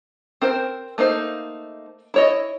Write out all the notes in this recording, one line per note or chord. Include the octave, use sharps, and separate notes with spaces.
C4 A#4 C5
A3 A#3 D#4 C5
E4 C#5 D#5